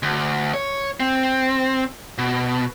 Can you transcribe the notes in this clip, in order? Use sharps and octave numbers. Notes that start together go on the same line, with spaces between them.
D2
C#5
C4
B2